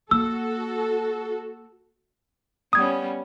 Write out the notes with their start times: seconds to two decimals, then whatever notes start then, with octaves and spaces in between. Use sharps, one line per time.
0.11 A#3 F#4 A4 E6
2.73 G3 B3 C#4 D#6 G#6